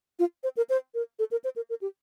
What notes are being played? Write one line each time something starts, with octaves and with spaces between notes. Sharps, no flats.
F4
C5
A#4
C5
A#4
A4
A#4
C5
A#4
A#4
G4